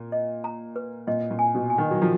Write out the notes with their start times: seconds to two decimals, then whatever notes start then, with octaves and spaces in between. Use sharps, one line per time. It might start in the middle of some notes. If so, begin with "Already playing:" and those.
Already playing: A#2
0.12 D#5
0.44 A#5
0.76 B4
1.07 A#2 D#5
1.31 A#2
1.39 G#5
1.55 B2
1.70 G#5
1.78 D#3
1.91 F#3
2.02 F3 A#5